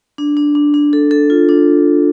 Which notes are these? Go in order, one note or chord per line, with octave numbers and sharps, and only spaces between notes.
D4
D4
D4
D4
A4
A4
F4
D4